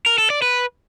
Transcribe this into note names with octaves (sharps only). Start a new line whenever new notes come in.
A#4
A4
D5
B4